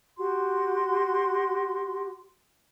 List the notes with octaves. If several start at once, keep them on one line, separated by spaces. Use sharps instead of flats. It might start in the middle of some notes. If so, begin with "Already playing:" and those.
F#4 G4 C6